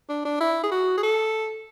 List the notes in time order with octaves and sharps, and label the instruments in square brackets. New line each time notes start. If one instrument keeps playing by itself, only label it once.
[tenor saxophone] D4
D4
E4
G#4
F#4
G#4
A4